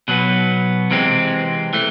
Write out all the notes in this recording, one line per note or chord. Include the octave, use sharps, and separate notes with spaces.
B2 F#3 B3
C3 E3 G#3 C4
E3 A3